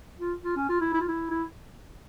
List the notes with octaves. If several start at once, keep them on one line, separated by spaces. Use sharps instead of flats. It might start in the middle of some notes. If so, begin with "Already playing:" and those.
F4
F4
C#4
F4
E4
E4
F4
E4
E4